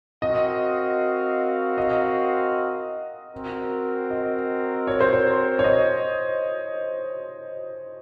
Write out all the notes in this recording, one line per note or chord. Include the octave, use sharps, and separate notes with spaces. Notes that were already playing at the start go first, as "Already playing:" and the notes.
C4 F#4 A#4 D#5 F5
D#5
C4 F#4 A#4
D#5
C#5
C5
C#5
C#5
D#5